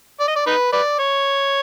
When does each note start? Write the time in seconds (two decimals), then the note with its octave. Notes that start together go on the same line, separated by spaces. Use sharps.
0.20 D5
0.28 D#5
0.36 D5
0.47 D#4 B4
0.72 B4 D5
0.99 C#5